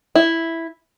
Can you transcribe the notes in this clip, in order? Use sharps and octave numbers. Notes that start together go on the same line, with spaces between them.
E4